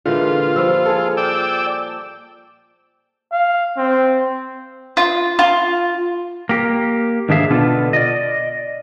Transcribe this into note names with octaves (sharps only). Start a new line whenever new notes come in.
A#2 D3 E3 G#3 F4
F3 G3 E6
G#4 A4
D5 G5 E6
F5
C4
F4
F4
A#3 G4
G#2 D#3 D4 G#4 E5 F5
B2 D3 B3 D4 F4 A4
D5 D#5